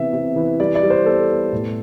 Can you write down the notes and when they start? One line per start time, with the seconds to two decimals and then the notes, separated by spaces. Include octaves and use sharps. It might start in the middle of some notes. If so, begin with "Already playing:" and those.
Already playing: C3 E3 B3 E5
0.13 C3
0.36 E3
0.60 G3 D5
0.75 D5
0.83 G3
0.90 C5
1.06 B3 A4
1.29 B3
1.53 A2